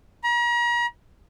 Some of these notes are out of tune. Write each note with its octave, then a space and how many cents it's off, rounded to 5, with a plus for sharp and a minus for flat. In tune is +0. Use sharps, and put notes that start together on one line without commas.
A#5 +40